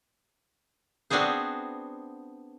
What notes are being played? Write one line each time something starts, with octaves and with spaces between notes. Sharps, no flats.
B3 C4 D4 F#4 G#4 C5